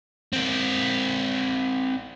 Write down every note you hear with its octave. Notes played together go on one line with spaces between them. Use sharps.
C4 A#4